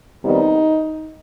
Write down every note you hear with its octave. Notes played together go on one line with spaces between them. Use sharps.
F2 C3 D#3 G3 B3 D#4